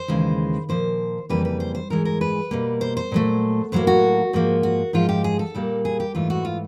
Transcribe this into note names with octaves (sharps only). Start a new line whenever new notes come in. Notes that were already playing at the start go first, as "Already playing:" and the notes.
Already playing: C5
D#2 C#3 E3 G#3
A#2 F3 A#3 C5
F2 C#3 E3 G3 A#3 B4
B4
C5
C5
G#2 E3 G#3 A#4
A#4
B4
B2 G3 A#3
C5
C5
A#2 F#3 A3
A2 F#3 A#3 C5
F#4
G#2 F3 A#3
F#4
G#2 F3 G#3 F4
G4
G#4
A4
A#2 G3 A#3
G#4
G4
G#2 E3 A3 F4
F#4
F4